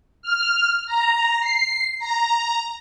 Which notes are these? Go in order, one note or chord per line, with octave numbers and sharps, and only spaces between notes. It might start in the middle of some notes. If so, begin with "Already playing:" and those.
F6
A#5
C7
A#5